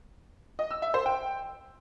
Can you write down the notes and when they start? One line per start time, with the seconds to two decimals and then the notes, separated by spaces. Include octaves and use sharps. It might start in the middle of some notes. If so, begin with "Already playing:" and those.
0.59 D#5
0.71 E6
0.82 E5
0.94 C5
1.06 G5